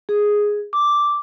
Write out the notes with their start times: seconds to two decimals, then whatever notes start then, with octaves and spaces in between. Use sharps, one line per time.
0.09 G#4
0.73 D6